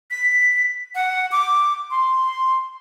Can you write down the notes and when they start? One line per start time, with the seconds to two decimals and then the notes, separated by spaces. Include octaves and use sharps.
0.11 B6
0.95 F#5
1.32 D6
1.91 C6